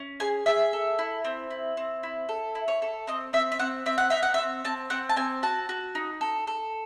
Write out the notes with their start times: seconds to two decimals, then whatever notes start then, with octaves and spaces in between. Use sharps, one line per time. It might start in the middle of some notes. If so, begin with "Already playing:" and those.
Already playing: C#4
0.20 G#4 G#5
0.46 G#4 E5
0.73 A4
0.99 E4
1.25 C4
1.51 E4
1.77 C4
2.03 E4
2.29 A4
2.55 E4
2.68 C#5
2.82 A4
3.07 C4 D#5
3.33 C4 E5
3.52 E5
3.59 C4 F#5
3.86 C4 E5
3.98 F#5
4.10 D#4 E5
4.23 F#5
4.34 E5
4.38 C4
4.64 C4 A5
4.90 C4 F#5
5.09 A5
5.16 C4 G#5
5.43 F#4 A5
5.69 F#4
5.95 D#4
6.21 A4
6.47 A4